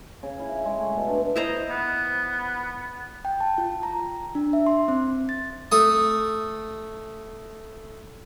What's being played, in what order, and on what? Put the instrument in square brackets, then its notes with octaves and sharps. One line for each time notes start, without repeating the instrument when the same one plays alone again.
[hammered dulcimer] C#3
E4
E5
G#3
A3
B2
D4
[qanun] E4 C5 A#5 [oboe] D#5
[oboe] B3
[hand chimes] G5
A5
F4
A#5
D4
E5
C6
C4
A6
[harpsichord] A3 D#6